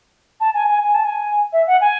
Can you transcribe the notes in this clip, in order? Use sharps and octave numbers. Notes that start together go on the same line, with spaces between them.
A5
G#5
G#5
G#5
A5
G#5
E5
F#5
G#5